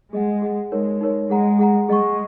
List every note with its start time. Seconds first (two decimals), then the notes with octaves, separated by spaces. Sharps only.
0.13 G#3 G#4 D#5 F#5
0.42 G#4 D#5 F#5
0.71 G#3 D#4 A#4 C#5
1.01 D#4 A#4 C#5
1.30 G#3 G#4 F#5 A#5
1.59 G#4 F#5 A#5
1.88 G#3 G#4 D#5 F#5 C#6